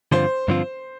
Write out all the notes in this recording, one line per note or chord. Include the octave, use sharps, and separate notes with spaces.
G2 D3 F3 C4 F4 C5
G2 D3 F3 C4 F4